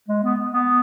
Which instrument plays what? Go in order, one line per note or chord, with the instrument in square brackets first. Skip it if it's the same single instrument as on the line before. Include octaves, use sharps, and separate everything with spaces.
[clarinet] G#3
B3
B3